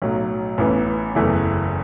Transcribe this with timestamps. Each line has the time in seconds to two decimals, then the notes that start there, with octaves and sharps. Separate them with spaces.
0.02 B1 A2 F#3
0.58 A1 A2 E3 B3
1.15 F#1 E2 E3 A3